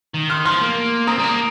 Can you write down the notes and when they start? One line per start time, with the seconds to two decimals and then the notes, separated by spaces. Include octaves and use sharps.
0.14 D#3
0.30 C6 F6
0.45 F3 C6 F6
0.61 A#3
1.07 C4 A#5 D#6
1.18 G3
1.23 A#3